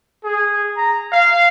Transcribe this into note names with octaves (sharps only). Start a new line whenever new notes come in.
G#4
A#5
F5